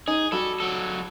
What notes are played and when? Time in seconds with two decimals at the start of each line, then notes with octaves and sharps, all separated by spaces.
0.08 D#4 G#4
0.32 G3 F#4 A4
0.60 F#3 A4